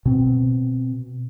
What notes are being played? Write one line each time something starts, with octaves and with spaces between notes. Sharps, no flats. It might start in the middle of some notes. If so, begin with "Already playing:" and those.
B2 C4